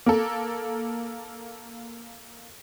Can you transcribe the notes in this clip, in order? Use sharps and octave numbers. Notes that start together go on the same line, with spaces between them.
A#3 A4